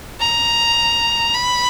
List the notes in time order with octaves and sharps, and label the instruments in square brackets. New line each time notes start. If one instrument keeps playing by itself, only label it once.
[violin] A#5
B5